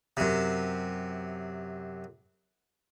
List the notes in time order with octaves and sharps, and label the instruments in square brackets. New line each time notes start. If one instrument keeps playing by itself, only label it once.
[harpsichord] F#2 C3